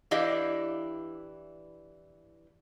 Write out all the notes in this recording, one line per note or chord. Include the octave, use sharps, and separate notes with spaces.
E3 D4 E4 G4 D#5 F5